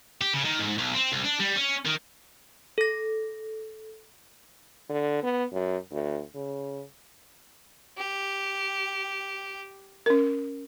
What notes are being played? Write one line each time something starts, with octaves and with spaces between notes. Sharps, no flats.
G4
C#3
D#3
G#2
B1
C4
C2
D4
G3
C#4
D#3
A4 A#6
D3
B3
F#2
D2
C#3
G4
C#4 A#4